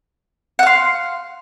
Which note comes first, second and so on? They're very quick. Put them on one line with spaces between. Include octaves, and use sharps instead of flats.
F#5 F5 C6